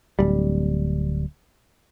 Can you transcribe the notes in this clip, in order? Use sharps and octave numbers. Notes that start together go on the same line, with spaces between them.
D1 G3